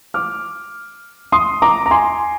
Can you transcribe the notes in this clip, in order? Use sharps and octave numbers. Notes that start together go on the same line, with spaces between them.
D6 F6
C6 D#6
A#5 D6
A#5
G#5 C6